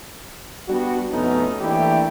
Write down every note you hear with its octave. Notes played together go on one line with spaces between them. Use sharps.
G3 B3 D4 F#4
F2 B2 A3 B3 C#4 D#4
E3 A3 A#3 D4 E4 G4